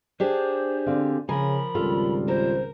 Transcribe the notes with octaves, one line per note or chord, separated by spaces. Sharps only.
D4 G4 G#4 C5
D3 C4 F5
C#3 F3 A#4 G#5 B5
G#1 C#2 G3 F4 A4
A#4 C5